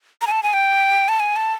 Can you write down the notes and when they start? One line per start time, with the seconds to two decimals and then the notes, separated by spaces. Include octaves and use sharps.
0.22 A#5
0.27 G#5
0.31 A5
0.43 G#5
0.53 G5
1.08 A5
1.20 G#5
1.36 A5